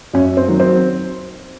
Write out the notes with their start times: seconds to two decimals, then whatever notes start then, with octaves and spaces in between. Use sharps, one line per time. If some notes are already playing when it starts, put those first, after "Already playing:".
0.13 F#2 C#4
0.37 C4
0.48 D#3 F#3
0.60 C4